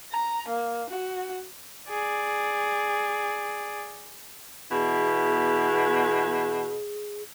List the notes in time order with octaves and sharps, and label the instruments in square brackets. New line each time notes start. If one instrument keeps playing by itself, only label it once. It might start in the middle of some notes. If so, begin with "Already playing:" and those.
[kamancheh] A#5
A#3
F#4
[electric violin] G#4 D5
[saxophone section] E2 B2 E4 [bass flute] G#4